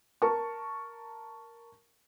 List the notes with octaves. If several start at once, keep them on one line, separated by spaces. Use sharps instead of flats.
A#4 A5 C#6